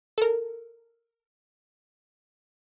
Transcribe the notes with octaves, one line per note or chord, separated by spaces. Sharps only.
A4 A#4